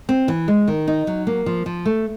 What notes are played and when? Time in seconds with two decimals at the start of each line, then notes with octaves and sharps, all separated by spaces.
0.09 C4
0.28 E3
0.48 G#3
0.68 D#3
0.88 D#4
1.07 F#3
1.27 A#3
1.46 F3
1.66 F3
1.86 A3